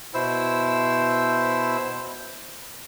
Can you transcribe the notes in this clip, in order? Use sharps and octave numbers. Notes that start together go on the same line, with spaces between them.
B2 E4 C5 E6